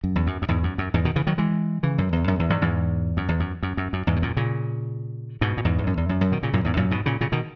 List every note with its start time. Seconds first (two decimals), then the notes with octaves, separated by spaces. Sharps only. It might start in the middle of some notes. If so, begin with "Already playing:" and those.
0.04 F#2
0.16 E2
0.27 F#2
0.42 F#2
0.48 E2 G#2
0.63 F#2
0.78 F#2
0.94 E2 G#2
1.05 B2 D#3
1.16 C#3 E3
1.27 D#3 F#3
1.38 E3 G#3
1.83 C#3 E3
1.98 F#2
2.13 E2
2.28 F#2
2.39 E2
2.50 E2 G#2
2.62 E2 G#2
3.17 F#2
3.29 E2
3.40 F#2
3.63 F#2
3.77 F#2
3.93 F#2
4.07 E2 G#2
4.16 B2
4.22 F#2 A#2
4.37 A#2 C#3
5.41 G#2 B2
5.57 A#2
5.65 E2 G#2
5.78 E2
5.87 F#2
5.97 E2
6.09 F#2
6.21 F#2
6.32 B2 D#3
6.43 A#2 C#3
6.53 F#2 A#2
6.65 E2 G#2
6.77 F#2 A#2
6.91 G#2 B2
7.06 A#2 C#3
7.21 A#2 C#3
7.32 B2 D#3